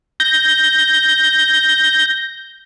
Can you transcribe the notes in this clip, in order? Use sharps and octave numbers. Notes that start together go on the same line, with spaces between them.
G6 A#6